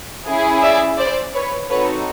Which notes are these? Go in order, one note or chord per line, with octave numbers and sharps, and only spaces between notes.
C#4 E4 G#4
D5 E5
C5 D5
B4 C#5
C4 D#4 F#4 A4 B4 C#5